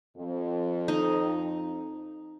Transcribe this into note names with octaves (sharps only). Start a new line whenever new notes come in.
F2
D#4